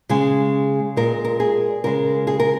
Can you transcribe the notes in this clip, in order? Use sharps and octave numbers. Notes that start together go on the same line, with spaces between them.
C#3 G#3 G#4
A#2 G#3 A#4
A#4
G#4
C#3 G#3 A#4
G#4
A#4